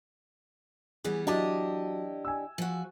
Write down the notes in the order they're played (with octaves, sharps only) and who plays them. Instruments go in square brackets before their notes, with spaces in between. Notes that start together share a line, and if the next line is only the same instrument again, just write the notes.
[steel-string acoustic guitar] E3 G3 B3 [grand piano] G#4
[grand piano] F#3 [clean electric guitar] D4 [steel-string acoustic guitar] E4 G4 D#5
[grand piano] G#5 E6
[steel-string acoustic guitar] F3 F#4